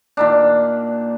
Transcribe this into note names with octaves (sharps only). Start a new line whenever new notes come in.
A#2 D#3 D4